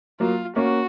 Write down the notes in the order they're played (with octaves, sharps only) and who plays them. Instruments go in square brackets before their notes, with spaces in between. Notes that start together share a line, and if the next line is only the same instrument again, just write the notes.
[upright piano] F#3 A#3 [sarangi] F4
[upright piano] A#3 C#4 [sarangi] F#4